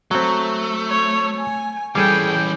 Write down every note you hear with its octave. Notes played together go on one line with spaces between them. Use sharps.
F#3 A3 C4
C#5
G#5
E3 G3 C#4 G#4 A4 G5